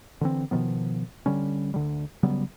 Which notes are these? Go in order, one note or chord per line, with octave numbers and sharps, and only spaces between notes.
D3 E3 C4
B2 D#3 F3 B3
D3 G3 C#4
D2 D3 G3
C#3 F#3 G3 B3